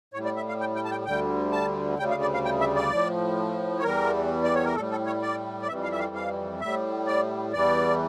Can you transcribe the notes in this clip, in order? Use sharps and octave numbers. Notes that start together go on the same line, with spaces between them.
A2 G3 C#5
D5
E5
F5
G5
G5
A5
G5
D2 D3 G3 G5
A5
D2 C#3 G3 G5
F5
D5
F5
G5
E5
D5
A2 F3
C#5
E2 E3 G3 A#4
D5
C#5
A#4
A2 G3 A4
A4
C#5
D5
D5
F2 E3 G3 E5
F5
E5
F5
F5
A2 G3 E5
D5
E2 E3 G3 D5